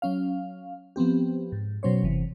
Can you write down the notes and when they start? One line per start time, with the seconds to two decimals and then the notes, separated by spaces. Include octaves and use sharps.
0.02 F#3 C#4 F5
0.96 F3 B3 C4 G4
1.52 G#2
1.83 B2 F#3 C#4 C5 C#5
2.03 G1 C3 E3